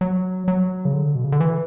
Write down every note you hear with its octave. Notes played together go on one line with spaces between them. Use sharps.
F#3
F#3
C#3
D3
B2
C#3
D3
E3